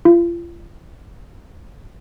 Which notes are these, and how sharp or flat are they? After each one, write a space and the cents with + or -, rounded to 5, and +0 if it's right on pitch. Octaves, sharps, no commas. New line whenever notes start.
F4 -35